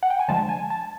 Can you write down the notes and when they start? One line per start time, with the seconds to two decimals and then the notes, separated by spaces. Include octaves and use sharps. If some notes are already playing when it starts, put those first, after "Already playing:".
0.03 F#5
0.10 G5
0.19 G#5
0.28 D3 F3 G#3 A5
0.49 G#5
0.70 A5